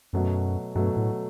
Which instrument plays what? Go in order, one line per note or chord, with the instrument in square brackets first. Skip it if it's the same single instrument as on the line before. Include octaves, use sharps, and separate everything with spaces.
[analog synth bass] F#2 [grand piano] B2 F#3 A3
[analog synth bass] G2 [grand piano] B2 F#3 A3
[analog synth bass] A2